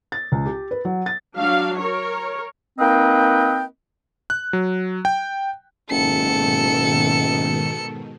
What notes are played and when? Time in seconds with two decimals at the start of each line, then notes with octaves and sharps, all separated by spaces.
0.12 A6
0.32 C#2
0.45 G4
0.71 B4
0.85 F#3
1.06 A6
1.36 F#3 D4 F5
1.77 A#4 C#5
2.78 A#3 C4 D#4 B4 D#5 G5
4.30 F#6
4.53 F#3
5.05 G5
5.90 F#1 G#2 B2 D#3 A4 C#7